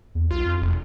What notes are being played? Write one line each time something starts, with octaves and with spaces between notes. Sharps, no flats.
E2
B1 F4
F2
E1